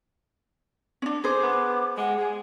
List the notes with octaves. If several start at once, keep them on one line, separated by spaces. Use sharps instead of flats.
C#4 D4
G#4 C5 D6
B3
G#3 F#5
G#4 G#5